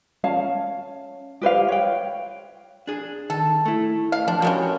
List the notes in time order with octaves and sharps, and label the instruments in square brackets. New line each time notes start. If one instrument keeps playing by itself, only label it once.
[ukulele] C#4 F5 A5
G4 B4 C5 F5
C#5 G5
[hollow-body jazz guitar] D4 G#4
[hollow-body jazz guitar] D#3 [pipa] A4
[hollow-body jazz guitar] A3 E4
[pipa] F5
[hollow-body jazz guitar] F3 [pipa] D4
[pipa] G3 G#3 C#4 [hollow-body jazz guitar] F#4 A#4